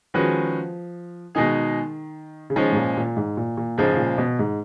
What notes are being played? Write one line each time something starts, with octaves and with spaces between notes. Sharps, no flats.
D#3 F3 G#3 C#4 F#4 B4
B2 D#3 G#3 D#4 G#4
C#3
D#3 F3 G#3 C#4
G#2
A#2
A#2
G#2
A#2
A#2
G#2 C#3 F3 G#3
G#2
A#2
B2
G#2